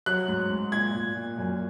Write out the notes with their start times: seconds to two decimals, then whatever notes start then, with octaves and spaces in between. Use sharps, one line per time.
0.06 F#3 F#6
0.28 G#2
0.50 G#2
0.72 A#2 G#6
0.94 A#2
1.16 A#2
1.38 F#2